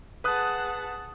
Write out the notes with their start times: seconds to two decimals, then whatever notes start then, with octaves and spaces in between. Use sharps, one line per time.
0.24 G#4 B4 F#5 A5 D#6 F#6